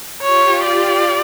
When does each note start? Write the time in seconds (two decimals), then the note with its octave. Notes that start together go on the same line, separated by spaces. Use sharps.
0.22 F4 G4 C#5
0.64 D5